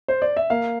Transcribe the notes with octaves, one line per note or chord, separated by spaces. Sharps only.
C5
D5
E5
A#3 F5